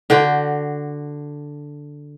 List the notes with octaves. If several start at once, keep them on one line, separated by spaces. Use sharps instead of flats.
D3 F#4 G5